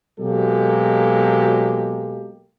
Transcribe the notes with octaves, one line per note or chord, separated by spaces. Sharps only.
B2 F#3 G#3 A#3 G4 A4